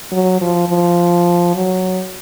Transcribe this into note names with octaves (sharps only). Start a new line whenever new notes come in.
F#3
F3
F3
F#3